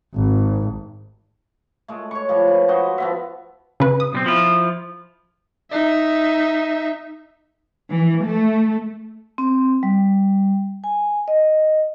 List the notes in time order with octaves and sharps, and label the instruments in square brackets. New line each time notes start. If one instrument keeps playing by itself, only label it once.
[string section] G#1
[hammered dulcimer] G#3 A3
C#5 C#6
F3 G3
B4 G#5
F#4 C5 D#5
F3 B3 E5
[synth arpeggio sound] C#3 B4
D#6
[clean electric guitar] B1 G3 C4
F3 E4 F4
[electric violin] D#4 E5
[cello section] E3
A3
[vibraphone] C4
G3
G#5
D#5